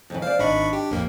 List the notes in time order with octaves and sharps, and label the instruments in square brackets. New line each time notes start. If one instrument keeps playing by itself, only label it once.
[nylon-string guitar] F2 C#3 E3
[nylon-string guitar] C5 D5 [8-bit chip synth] F5
[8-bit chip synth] G#1 B5 C#6 [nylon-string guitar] D4 D#5
[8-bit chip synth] G4
A1 F2 A#3